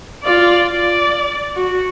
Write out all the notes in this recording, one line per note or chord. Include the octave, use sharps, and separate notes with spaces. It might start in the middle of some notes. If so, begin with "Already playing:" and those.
F4 D5
D5
F#4